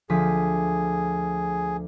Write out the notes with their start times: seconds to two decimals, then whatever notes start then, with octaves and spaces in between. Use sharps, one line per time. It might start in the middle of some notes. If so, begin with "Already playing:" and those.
0.10 D2 F3 G#4 B6